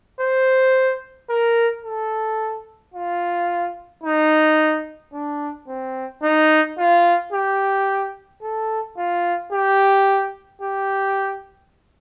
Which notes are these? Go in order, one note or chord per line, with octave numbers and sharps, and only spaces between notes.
C5
A#4
A4
F4
D#4
D4
C4
D#4
F4
G4
A4
F4
G4
G4